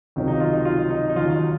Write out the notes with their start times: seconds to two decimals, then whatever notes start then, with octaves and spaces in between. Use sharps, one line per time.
0.16 C#2 C3 D#3 F#3
0.28 D#4
0.40 F4
0.53 D#4
0.65 F4
0.90 D#4
1.10 D#4
1.15 D#2 C#3 F#3 F4